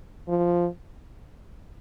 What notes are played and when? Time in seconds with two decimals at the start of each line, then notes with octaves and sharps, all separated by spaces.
0.28 F3